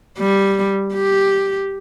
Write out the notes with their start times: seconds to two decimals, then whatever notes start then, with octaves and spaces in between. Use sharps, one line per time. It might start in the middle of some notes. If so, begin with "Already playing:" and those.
0.18 G3
0.94 G4